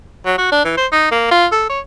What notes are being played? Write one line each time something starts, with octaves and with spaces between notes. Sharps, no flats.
F#3
F#4
D4
E3
C5
D#4
A#3
F4
A4
C#5